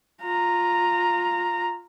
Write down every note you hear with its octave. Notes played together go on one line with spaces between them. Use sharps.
F4 A#5